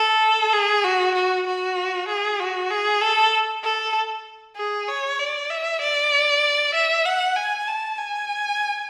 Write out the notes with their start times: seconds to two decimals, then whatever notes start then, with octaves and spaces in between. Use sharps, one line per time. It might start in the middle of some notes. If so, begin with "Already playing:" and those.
Already playing: A4
0.53 G#4
0.85 F#4
1.16 F#4
1.47 F#4
2.09 G#4
2.41 F#4
2.71 G#4
3.02 A4
3.64 A4
4.57 G#4
4.89 C#5
5.19 D5
5.51 E5
5.82 D5
6.75 E5
7.06 F#5
7.36 G#5
7.68 A5
7.98 G#5